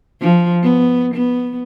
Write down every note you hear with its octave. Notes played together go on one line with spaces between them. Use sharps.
F3
B3
B3